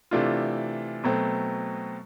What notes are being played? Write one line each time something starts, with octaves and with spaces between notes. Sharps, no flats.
C3 E3 A3 D4 F4
B2 F#3 A3 C4